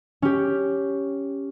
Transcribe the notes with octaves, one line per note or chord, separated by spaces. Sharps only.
C#4 G4